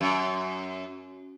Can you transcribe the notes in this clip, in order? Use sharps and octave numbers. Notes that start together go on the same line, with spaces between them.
F#2